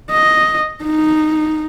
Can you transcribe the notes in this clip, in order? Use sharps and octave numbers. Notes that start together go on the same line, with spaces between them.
D#5
D#4